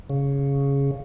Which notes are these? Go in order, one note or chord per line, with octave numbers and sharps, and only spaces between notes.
C#3